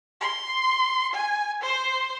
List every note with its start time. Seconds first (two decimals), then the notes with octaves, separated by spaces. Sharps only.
0.21 C6
1.13 G#5
1.62 C5